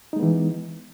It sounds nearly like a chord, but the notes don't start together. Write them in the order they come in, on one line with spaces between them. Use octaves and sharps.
D#4 G#3 B3 E3